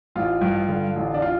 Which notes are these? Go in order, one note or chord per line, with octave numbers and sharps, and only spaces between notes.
A1 F4
G2
D3
A1
D4
F4